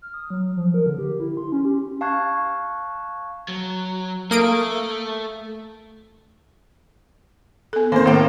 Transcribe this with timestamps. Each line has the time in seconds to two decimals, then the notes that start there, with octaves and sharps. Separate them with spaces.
0.02 F6
0.14 D#6
0.30 F#3
0.56 F3
0.74 A#4
0.86 D3
0.98 G4
1.19 E4
1.37 C6
1.52 C#4
1.65 G4
2.01 F5 A5 C#6 F#6 G#6 C7
3.48 F#3
4.31 A3 A#3 D#6 D7
7.73 B3 A4
7.92 D#3 A#3 C4 D#4 C5
8.05 A2 A3 A#3